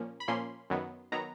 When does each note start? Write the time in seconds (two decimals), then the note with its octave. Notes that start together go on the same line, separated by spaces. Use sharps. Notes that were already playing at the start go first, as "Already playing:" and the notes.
Already playing: A#2 F3 A#3 C#4
0.20 B5
0.28 A#2 F3 A#3 C#4 C6
0.70 F#2 D#3 F#3 B3
1.12 D#3 F#3 B3 A#5